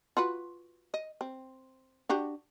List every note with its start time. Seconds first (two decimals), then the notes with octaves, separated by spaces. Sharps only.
0.17 F4 F#4 B4
0.94 D#5
1.21 C4
2.09 D4 F#4 G4